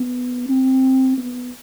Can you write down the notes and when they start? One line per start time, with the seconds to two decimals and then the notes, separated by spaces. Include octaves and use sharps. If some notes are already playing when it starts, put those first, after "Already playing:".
Already playing: B3
0.49 C4
1.18 B3